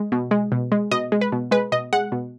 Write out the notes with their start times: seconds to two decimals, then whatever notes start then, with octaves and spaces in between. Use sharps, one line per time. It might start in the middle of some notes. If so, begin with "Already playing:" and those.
Already playing: G#3
0.12 B2
0.31 G#3
0.52 B2
0.72 G#3
0.92 B2 D#5
1.12 G#3
1.21 B4
1.32 B2
1.51 G#3 B4
1.72 B2 D#5
1.93 G#3 F#5
2.12 B2